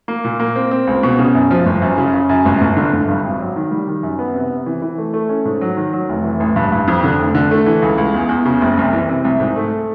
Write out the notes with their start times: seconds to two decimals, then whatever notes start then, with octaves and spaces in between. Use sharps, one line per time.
0.08 A#3
0.24 A#2
0.40 A#3
0.56 C4
0.71 C4
0.87 C#2
1.03 B2
1.19 C#3
1.35 F#2
1.51 F3
1.66 G1
1.82 F#2
1.98 C#3
2.14 C#3
2.29 F#2
2.45 G1
2.61 G1
2.77 D3
2.93 G1
3.09 G2
3.24 G#1
3.40 F#3
3.56 D#3
3.71 G3
3.87 D#3
4.03 F#2
4.19 B3
4.35 C3
4.51 C3
4.66 E3
4.82 E3
4.98 A3
5.14 A3
5.29 C#4
5.45 G#2
5.61 F#3
5.77 D#3
5.93 F#3
6.09 F1
6.24 E3
6.40 A1
6.56 G2
6.72 G2
6.88 F2
7.03 D3
7.19 F1
7.35 D3
7.51 A3
7.66 E3
7.82 C#2
7.98 C#2
8.14 E2
8.29 E2
8.45 C#3
8.61 F#1
8.77 C2
8.93 E3
9.09 C3
9.24 C2
9.40 G#2
9.56 A3